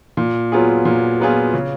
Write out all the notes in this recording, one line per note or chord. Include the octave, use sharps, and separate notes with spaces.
A#2
F#3 B3 F4 G#4
A#2
F#3 B3 F4 G#4
C#3